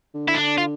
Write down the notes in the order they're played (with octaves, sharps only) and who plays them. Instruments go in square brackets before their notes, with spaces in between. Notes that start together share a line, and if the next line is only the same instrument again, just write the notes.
[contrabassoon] D3
[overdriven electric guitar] E4
D4
F4